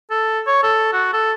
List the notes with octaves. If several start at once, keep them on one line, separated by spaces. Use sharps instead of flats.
A4
C#5
A4
F#4
A4